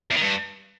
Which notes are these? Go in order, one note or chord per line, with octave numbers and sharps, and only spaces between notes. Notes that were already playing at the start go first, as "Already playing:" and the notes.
E2
D#3
G2